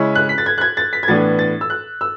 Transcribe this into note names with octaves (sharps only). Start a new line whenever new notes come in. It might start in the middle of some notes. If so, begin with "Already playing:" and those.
Already playing: C#3 G#3 C#4 E4
F#6
B6
A6
G#6
F#6
G#6
A6
B6
G#6
A2 E3 B3 D4 A6
A6
E6
F#6
E6